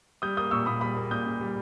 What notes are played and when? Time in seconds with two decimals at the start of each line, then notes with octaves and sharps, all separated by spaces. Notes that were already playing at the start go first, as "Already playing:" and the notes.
0.22 G3 D#6 G6
0.37 A#3 D#6 G6
0.51 A#2 C#6 E6
0.66 A#2 B5 D#6
0.81 G3 B5 D#6
0.96 A#3
1.11 A#2 D#6 G6
1.26 A#2
1.41 G3